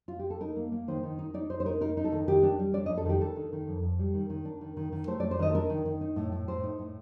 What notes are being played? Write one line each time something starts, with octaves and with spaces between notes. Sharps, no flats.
F4
G4
A4
D#4 A#4
A#3
A#3
D#3 C5
D#3
D#4
D#4 D5
D#4 C5
C5
D#4 A#4
D#4 A#4
D#4
A4
D#3
D#3 G4
D4
G3
D4 D5
D#5
F2
A4
D#3 G4
D4 A4
D#3
D#3
F2
F2
G3
D#3
D#3
D4
D#3
D#3
D#3
A3 C5
D5
A3
C5
D#3 D#5
A4
D4 A#4
D#3
D#3
D#4
A2
A2
A2 C5
D#4
A2